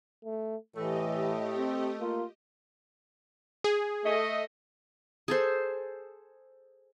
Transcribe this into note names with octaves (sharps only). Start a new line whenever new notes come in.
A3
A2 E3 A3 G4 D#5
C4
A#3 F4
G#4
A3 D#5
G#4 A4 C5